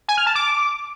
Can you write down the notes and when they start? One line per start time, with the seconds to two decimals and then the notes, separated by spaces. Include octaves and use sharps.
0.09 G#5
0.17 F6
0.26 A5
0.35 D6